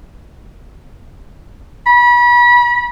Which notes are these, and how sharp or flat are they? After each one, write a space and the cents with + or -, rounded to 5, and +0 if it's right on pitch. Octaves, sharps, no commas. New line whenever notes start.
B5 -30